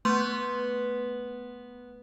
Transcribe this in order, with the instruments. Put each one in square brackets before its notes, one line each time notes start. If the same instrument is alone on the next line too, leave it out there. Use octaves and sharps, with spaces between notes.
[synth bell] A3 C6 [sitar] B3